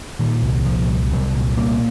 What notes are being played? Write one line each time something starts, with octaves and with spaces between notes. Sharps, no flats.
A#2 D#3
C2
A#2 F3
C2
C2 F#3
A#2
C2 A#3